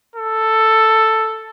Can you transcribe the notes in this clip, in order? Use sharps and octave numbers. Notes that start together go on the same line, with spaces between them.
A4